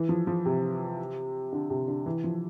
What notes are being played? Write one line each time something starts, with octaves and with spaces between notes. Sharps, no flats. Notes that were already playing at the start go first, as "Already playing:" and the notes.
Already playing: E3
F3
F3
C3
D3
C3
D3
E3
F3